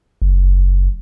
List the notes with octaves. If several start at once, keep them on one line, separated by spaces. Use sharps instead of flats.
F#1